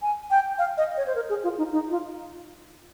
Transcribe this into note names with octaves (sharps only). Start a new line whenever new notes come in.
G#5
G5
F5
D#5
C#5
C5
A#4
G#4
F4
D#4
D#4
F4